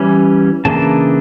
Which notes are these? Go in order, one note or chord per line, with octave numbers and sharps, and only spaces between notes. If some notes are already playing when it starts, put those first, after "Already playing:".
Already playing: E3 G3 C#4
C#3 E3 A#3 D4 A5